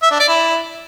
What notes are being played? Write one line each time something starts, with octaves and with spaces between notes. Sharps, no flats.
E5
D4
D5
E4